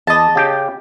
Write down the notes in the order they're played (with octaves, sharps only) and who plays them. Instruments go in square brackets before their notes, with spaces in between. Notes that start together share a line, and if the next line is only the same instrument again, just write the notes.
[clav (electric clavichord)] E2 [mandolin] D#5 A5
[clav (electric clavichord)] C#3 G4 G5